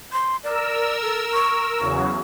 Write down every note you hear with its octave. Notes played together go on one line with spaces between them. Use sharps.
C6
A#4 D5 E6
A4
C#6
E2 C#3 F#3 C#6